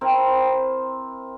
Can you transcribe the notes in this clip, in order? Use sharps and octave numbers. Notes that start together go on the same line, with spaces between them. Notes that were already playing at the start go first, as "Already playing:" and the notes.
C4 E4 A#4 E5